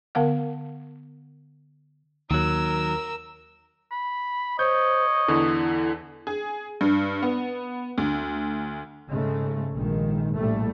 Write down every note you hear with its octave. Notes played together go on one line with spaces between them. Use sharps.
D3 B3 A#4 F5 F#5
D#2 D#3 F#3 A#4 E6
B5
C5 C#5 D#5 G6
E2 D3 E4
G#4
G2
B3
D2
G#2 C#3 G#3 A3
A#1 D#3 G#3
A#1 A2 G3 A3